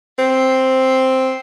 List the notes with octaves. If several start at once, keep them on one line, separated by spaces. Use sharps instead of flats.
C4